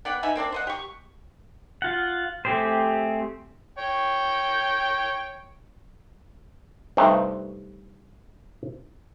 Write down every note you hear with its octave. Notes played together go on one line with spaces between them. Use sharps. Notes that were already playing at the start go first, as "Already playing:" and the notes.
B3 D5 F#5 G5
D#4 B4 E5 G#5
A#3 C4 D4 D5
C5 D#5 F#5
G4 C#6
F4 F#5
A3 C4 G4 G#4 C5
C#5 G5
G2 C3 A3 D#4 B4 E5